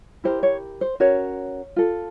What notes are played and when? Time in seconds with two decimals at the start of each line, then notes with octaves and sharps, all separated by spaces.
0.24 E4 G4 A#4 C5
0.43 C#5
0.81 C5
1.00 C#4 F#4 A#4 C#5
1.76 F4 A4